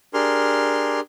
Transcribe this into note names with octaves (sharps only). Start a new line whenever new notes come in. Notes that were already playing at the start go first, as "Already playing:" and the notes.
D4 G4 G#4 A#4 C6 F6